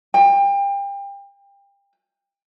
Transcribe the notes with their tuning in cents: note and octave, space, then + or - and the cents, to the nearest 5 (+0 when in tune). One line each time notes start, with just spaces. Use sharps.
G5 +30